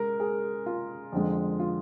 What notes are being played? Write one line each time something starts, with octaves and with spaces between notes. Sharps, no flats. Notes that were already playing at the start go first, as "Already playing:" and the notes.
Already playing: G#3 A#4
G#4
F4
F2 D3 G#3
F4